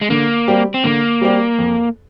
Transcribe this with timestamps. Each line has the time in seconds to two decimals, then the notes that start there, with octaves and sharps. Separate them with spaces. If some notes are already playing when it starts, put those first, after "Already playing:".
0.01 G#3
0.10 D3 A#3
0.48 G3 C4 G4 D5
0.74 C4
0.84 D3 A#3
1.21 G3 C4 G4 D5
1.59 F2